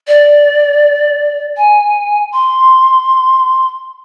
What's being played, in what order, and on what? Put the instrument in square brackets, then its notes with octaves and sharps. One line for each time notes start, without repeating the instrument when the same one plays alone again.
[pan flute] D5
G#5
C6